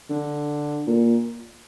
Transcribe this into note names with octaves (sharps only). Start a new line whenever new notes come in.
D3
A#2